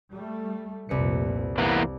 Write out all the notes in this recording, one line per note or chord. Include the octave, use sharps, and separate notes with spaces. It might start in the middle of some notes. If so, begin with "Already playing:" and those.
G3 A3
F1 C2 F2 A#2 B4 C#7
E3 A#3 B3